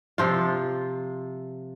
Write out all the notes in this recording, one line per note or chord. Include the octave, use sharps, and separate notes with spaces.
C3 F3 F4